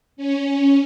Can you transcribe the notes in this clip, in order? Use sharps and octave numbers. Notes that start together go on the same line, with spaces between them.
C#4